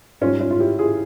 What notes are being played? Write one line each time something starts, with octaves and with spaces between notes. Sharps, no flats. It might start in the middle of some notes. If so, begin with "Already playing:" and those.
G#2 G3 C#4 F4
C#4 F4
F4
E4 G4
F4 G#4